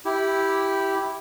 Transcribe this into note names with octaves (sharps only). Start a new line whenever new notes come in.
E4 G4